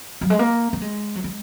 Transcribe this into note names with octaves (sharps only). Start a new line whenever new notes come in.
F#3
G#3
A#3
A#3
G#3
F#3
G#3